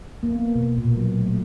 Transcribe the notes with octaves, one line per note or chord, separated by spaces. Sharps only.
A#3
B3
B2
A#2
F#3
A3